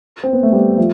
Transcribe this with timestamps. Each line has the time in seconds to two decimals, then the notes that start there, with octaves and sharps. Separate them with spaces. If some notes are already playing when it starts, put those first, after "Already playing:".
0.23 C4
0.33 B3
0.43 A3
0.53 G3 B3
0.78 F3 A3